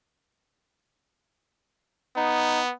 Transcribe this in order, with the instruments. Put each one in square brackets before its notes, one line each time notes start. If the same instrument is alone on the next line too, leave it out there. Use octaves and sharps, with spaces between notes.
[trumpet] B3 [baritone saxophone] D#4